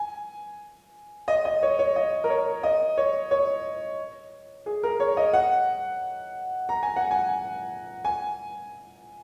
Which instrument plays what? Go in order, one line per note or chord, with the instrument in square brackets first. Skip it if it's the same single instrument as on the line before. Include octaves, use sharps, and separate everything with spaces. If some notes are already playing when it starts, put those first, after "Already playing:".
Already playing: [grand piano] G#5
D#5
D#5
C#5
C#5
D#5
A#4
C#5
D#5
C#5
C#5
G#4
A#4
C#5
D#5
F#5
A#5
G#5
F#5
G#5
G#5